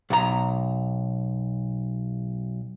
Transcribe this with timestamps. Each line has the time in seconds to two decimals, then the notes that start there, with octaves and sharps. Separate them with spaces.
0.10 B1 A#5